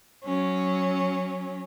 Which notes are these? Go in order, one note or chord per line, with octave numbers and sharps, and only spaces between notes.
F#3 C#4